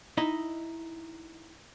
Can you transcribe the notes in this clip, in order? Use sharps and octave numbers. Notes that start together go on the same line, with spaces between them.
D#4 E4 D#5